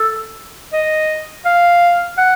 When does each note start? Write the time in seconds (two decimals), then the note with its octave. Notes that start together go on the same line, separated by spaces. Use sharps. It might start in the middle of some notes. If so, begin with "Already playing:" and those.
Already playing: A4
0.73 D#5
1.45 F5
2.18 F#5